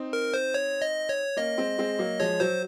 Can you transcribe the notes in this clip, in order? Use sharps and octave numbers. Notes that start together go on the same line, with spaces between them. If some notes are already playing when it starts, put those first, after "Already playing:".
Already playing: C4 D#4
A#4
C5
C#5
D#5
C#5
A#3 C#4 D#5
G#3 C4
G#3 C4
F#3 A#3
F3 G#3 C#5
F#3 C5